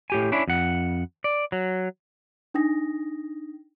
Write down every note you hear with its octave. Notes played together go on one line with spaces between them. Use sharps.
A2 G4 G#5
C#4 D4 E4
F2 F#5
D5
F#3
D4 D#4 G5 D#6 A#6